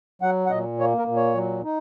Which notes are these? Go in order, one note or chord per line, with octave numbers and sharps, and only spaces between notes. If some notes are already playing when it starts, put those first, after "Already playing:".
F#3 F#5
F#5
A#2 D#5
A#3 C#5
A#4
A#2
C#5
F#3
D#4